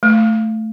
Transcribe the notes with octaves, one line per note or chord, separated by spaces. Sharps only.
A3